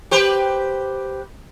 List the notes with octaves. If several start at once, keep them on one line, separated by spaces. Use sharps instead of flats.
G4 B4 C5